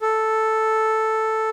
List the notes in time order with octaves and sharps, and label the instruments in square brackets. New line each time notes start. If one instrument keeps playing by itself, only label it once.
[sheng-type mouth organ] A4